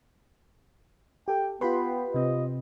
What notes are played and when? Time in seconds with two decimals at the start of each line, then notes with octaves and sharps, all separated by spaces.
1.28 G4 A4 G5
1.61 B3 F4 G4 B4 G5 B5 C6
2.14 C3 C4 D#5